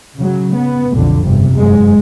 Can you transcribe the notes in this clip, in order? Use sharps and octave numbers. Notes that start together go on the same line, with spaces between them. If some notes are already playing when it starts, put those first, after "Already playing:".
C#3 F#3
B3
B1 F2 D3
G1 C3
G1 F#2 G#3